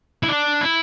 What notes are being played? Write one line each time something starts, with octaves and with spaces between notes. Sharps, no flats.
E4
D4
E4